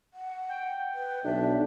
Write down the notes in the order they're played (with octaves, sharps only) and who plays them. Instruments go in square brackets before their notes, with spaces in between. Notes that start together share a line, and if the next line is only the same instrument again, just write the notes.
[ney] F#5
[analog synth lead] G5
[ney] B4
[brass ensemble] B1 [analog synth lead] D4 [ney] E5